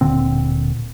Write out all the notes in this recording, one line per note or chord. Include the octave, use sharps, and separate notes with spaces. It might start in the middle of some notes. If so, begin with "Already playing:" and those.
D1 A#2 D3 C4